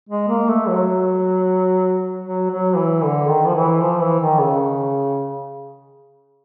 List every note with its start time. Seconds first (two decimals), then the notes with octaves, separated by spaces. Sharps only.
0.09 G#3
0.28 A#3
0.48 A3
0.68 F#3
2.25 F#3
2.51 F#3
2.76 E3
3.03 D3
3.29 D#3
3.47 F3
3.55 E3
3.81 F3
4.01 E3
4.20 D#3
4.40 C#3